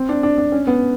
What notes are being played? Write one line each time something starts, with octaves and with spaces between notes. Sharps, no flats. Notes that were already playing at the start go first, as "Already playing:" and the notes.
Already playing: C4
D4
D4
D4
C#4
B3